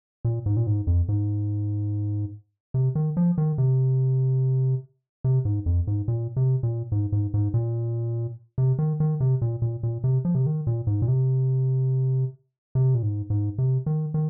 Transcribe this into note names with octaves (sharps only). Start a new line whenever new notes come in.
A#2
G#2
A#2
G#2
F2
G#2
C3
D#3
F3
D#3
C3
C3
G#2
F2
G#2
A#2
C3
A#2
G#2
G#2
G#2
A#2
C3
D#3
D#3
C3
A#2
A#2
A#2
C3
F3
C3
D#3
A#2
G#2
A#2
C3
C3
A#2
G#2
G#2
C3
D#3
D#3